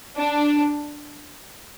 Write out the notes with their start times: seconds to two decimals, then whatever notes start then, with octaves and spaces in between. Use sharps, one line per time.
0.19 D4